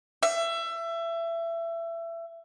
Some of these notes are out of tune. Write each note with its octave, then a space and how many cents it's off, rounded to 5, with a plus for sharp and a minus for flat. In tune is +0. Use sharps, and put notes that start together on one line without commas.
E5 +25